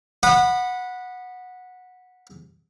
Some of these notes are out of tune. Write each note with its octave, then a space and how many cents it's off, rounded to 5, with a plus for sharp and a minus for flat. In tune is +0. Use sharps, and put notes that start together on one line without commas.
F#5 -15 B5 -5 D#6 -35